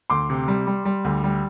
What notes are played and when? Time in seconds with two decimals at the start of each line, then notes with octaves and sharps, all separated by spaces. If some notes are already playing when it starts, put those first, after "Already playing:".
0.10 D2 C6 D6
0.30 C3
0.48 G3
0.67 G3
0.85 G3
1.05 D2
1.24 G3